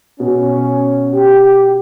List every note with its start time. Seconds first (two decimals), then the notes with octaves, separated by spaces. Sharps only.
0.20 B2 C#4
1.13 G4